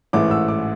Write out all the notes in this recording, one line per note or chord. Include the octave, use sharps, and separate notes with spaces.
A1 G#2 E3 A3 D6
E6
D6